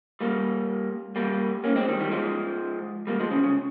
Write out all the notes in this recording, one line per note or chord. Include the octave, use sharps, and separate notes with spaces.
G3 A#3
G3 A#3
A#3 C#4
G#3 C4
D#3 G3
D#3 G3
F3 G#3
G3 A#3
F3 G#3
C#3 F3
C#3